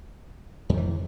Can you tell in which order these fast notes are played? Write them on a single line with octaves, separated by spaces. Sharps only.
F2 D#3 E3